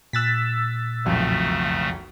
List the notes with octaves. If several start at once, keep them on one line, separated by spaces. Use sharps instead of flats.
A#2 E6 F#6 A6 B6
E1 B1 F2 C#3 A3